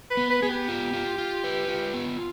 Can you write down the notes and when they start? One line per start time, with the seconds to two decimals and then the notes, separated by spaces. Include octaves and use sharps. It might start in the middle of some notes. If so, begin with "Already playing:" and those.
0.10 B4
0.17 B3
0.30 B4
0.42 B3 G#4
0.49 G4
0.68 F4
0.93 F4
1.18 F4
1.44 B4
1.68 F4
1.94 B3